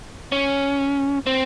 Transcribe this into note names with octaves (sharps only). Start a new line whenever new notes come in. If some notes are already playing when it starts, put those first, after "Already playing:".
C#4
C4